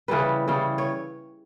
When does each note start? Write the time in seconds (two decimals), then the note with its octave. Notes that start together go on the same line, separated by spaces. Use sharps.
0.08 C#3 E3 G3 B4
0.48 C#3 E3 G3
0.78 C#5